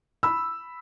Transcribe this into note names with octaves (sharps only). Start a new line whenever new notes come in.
B5 E6